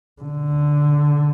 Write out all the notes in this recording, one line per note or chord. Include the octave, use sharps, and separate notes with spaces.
D3